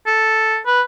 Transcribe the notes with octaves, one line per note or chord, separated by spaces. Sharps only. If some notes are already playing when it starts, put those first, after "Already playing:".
A4
B4